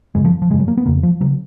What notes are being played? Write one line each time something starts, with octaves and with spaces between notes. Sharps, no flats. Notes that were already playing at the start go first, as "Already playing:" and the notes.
F#2 C#3 G#3
F3
F3
F#2 C#3 G#3
F#3
A#3
B3
F2 C#3 A#3
F3
C#3 F#3